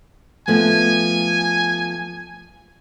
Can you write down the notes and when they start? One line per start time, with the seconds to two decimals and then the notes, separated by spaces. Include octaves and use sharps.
0.48 F3 A3 B3 G#5